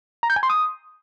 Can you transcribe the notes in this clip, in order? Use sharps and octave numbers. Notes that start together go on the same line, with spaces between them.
A#5
G6
G#5
C6
D#6